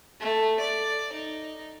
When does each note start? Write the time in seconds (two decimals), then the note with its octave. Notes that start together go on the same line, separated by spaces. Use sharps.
0.20 A3
0.59 D5
1.13 D#4